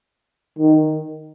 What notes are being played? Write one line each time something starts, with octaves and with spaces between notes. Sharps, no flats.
D#3